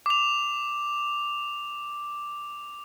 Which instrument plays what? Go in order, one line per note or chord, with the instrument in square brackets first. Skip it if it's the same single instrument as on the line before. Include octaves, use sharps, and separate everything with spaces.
[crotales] D6 F7